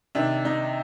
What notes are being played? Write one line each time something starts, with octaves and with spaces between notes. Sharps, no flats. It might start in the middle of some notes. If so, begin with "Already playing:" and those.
C3 D#3 D4
D#4